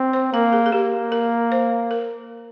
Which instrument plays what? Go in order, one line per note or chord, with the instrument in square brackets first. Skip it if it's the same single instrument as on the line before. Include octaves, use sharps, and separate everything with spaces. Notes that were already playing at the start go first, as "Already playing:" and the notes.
Already playing: [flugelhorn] C4
[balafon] C5
[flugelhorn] A#3 [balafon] A#4
[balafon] G#4
G#4
[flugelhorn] A#3 [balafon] G4
[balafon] A#4
C5
A#4